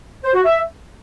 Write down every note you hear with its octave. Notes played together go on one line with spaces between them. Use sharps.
C5
F#4
E5